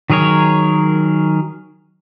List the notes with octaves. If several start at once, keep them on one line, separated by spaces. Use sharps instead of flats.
D#3 F#3 G#4 A#4 C#5